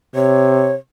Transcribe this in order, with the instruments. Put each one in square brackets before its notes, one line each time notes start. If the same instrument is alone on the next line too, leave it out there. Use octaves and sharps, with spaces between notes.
[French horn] C3 [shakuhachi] C#5